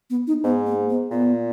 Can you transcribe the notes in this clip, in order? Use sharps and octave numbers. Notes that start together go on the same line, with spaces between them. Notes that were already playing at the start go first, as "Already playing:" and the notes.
B3
D#4
G#2 B3
A#3
B3
A#2 B3